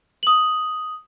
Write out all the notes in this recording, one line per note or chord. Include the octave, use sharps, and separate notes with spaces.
D#6 F#7